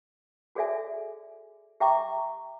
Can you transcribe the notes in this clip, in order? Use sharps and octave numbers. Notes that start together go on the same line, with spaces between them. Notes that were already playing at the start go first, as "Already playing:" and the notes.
F#4 G#4 A4 D5 E5 G#5
G4 E5 G5 A#5 C#6 D6